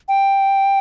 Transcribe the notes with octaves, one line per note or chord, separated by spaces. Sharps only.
G5